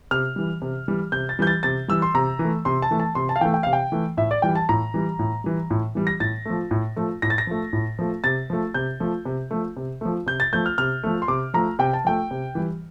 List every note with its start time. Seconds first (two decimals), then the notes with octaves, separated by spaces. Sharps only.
0.11 C3 F6
0.36 E3 G3
0.62 C3
0.88 E3 G3
1.12 C3 G6
1.29 A6
1.39 E3 G3 G6
1.47 A6
1.63 C3 A6
1.88 E3 G3 E6
2.02 C6
2.14 C3 A#5
2.39 E3
2.44 A3
2.65 C3 C6
2.82 A5
2.91 E3 A3
3.00 A5
3.15 C3 C6
3.29 A5
3.36 F5
3.41 E3 A3 G5
3.54 G5
3.63 C3 F5
3.73 G5
3.92 E3 A3
4.17 A2 E5
4.31 D5
4.42 E3 G3 G5
4.55 A5
4.69 A2 A#5
4.94 E3 G3
5.19 A2
5.44 E3 G3
5.70 A2
5.95 E3 G3
6.07 A#6
6.20 A2 A6
6.45 F3 A3
6.71 A2
6.96 F3 A3
7.22 A2 A#6
7.30 A6
7.38 A#6
7.47 F3 A3
7.73 A2
7.99 F3 A3
8.24 C3 A6
8.50 F3 A3
8.74 C3 G6
9.00 F3 A3
9.25 C3
9.51 F3 A3
9.77 C3
10.01 F3 A3
10.26 C3 G6
10.40 A6
10.53 F3 A3 G6
10.66 F6
10.78 C3 F6
11.03 F3 A3
11.22 C6
11.28 C3 D6
11.54 F3 A3 A#5
11.79 C3 G5
11.93 A5
12.05 F3 A3 G5
12.31 C3
12.55 E3 G3